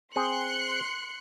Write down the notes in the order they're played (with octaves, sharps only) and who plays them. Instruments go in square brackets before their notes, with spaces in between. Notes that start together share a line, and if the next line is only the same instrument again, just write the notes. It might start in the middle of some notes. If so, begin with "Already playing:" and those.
[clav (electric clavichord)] C4 G#4 [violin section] C6 F#6 C#7